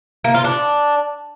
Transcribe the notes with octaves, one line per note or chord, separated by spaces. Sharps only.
A#3
F4
D4